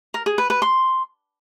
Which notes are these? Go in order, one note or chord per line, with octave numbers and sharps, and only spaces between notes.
A#4
G#4
B4
B4
C6